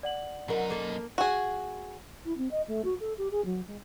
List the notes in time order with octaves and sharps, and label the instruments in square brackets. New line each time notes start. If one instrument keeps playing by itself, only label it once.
[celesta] D5 F#5 F#7
[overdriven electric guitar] F#2 D#4 [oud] F#3 A#4
[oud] A#3 A4
[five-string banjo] F#4 G#4
[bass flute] E4
C4
D#5
A3
F#4
A4
G4
G#4
F#3
G#3